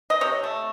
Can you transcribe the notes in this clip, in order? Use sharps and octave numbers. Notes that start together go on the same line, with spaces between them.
D#5
C3 C#5
A3